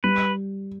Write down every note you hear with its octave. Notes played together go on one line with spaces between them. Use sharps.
G3 B4